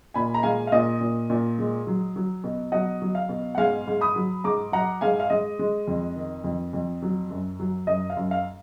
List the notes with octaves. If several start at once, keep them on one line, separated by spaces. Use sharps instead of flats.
A#2 G#5 B5
A#5
G#3 F5 G#5
F5
A#2 D#5
A#2
A#2
G#3
F#3
F#3
B2
F#3 D#5 F#5
F#3
F5
B2
F#5
G#2 F5 G#5
G#2
B5 D#6
F#3
G#2 A#5 D6
F#3 F#5 A#5
G#2 F5 G#5
F5
G#3 D#5
G#3
F2
D#3
F2
F2
F#3
F#2
F#3
F#2 D#5
F5
F#2
F5